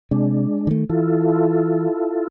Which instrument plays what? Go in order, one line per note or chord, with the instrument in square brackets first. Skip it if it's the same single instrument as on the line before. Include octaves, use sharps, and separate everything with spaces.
[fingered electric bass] C3 [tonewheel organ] G#3 D4
[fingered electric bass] D#3 A3
[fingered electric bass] E3 [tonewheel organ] E4 F4 A4